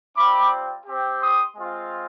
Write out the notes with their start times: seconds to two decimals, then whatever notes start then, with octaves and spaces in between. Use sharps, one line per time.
0.16 G3 C4 F4 B5 D6
0.86 C4 G4
1.22 C6 D#6
1.56 G#3 C4 F4